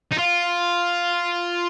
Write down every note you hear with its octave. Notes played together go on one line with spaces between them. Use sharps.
D#4
F4